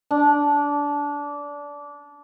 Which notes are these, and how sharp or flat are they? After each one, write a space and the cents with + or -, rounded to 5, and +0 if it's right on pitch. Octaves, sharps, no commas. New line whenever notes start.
D4 -20